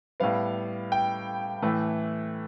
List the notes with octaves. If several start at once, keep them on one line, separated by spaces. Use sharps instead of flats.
A2 G3 B3 F5
G5
A2 E3 A3